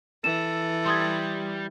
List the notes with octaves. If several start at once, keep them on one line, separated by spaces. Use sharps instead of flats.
E3 A4 E7
G3 C6 D#6 G#6